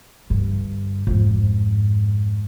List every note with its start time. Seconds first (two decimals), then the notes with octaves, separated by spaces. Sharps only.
0.30 G2 D3
1.07 F2 G#2